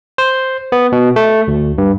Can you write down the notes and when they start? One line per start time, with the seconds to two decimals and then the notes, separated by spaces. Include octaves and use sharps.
0.18 C5
0.72 B3
0.92 B2
1.16 A3
1.48 D2
1.78 G2